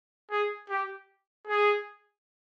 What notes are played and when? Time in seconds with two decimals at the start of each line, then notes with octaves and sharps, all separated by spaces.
0.31 G#4
0.69 G4
1.47 G#4